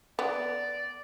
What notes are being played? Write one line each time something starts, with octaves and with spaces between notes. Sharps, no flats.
B3 D5